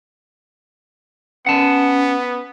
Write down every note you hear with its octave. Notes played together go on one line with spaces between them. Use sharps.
B3 C#4 F#5 A5